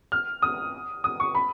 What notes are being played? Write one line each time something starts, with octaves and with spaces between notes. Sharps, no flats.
F6
D#6
D#6
C#6
B5